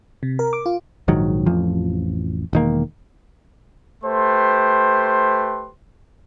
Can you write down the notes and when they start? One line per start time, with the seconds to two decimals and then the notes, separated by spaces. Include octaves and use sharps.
0.23 C3
0.39 A#4
0.53 D6
0.66 F4
1.08 A#1 G#2 D#3 F#3
1.46 A1 F2 F3
2.53 E1 D#3 A#3
4.04 A3 G4 B4 C5 C6